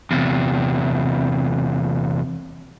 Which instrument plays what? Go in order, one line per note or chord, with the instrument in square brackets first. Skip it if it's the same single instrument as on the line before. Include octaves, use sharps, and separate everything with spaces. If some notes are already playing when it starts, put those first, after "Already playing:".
[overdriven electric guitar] E2 C3